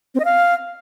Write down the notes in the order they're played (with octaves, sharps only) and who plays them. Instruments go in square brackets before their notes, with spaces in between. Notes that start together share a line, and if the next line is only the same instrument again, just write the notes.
[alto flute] C4
D#5
F5